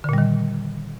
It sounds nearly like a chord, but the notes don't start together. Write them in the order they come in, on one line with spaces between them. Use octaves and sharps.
D3 A#2 G3 D#3